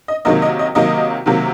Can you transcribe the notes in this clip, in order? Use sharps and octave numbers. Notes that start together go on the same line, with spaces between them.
D#5
C3 D#3 F#3 A#3 D#5
D#5
D#5
C3 D#3 F#3 A#3 D#5
C3 D#3 F#3 A#3